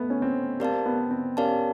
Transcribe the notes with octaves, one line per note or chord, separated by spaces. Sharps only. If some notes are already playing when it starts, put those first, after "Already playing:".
Already playing: A3 B3
C#4
C4
C4 G4 A#4 D5 F5 A5
B3
C4
C#4 G4 A#4 D5 F5 A5